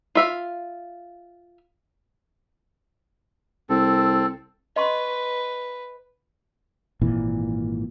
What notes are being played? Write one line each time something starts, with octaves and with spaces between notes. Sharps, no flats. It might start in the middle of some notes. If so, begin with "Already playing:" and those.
F4 E5 F5
C2 C4 A4
B4 D#5 C6 C#6
G#1 A#2 E3